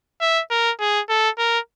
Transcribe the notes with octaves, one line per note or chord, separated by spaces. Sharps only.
E5
A#4
G#4
A4
A#4